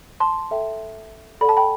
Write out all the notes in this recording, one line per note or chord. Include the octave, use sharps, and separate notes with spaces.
A5 C6
A4 E5 G5
A4 D5 F#5 B5
A5
G5 B5